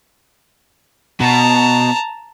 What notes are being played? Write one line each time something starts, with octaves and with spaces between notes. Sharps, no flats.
B2 A5 A#5